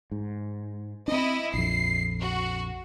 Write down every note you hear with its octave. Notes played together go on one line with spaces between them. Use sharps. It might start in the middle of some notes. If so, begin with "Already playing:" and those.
G#2
C4 D4 E4 D#5
A#1 F2 C7
F#4